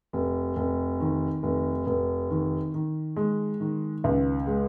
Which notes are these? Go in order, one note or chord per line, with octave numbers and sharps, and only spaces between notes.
F1
F1
D#3
F1
F1
D#3
D#3
G#3
D#3
C#2
G#3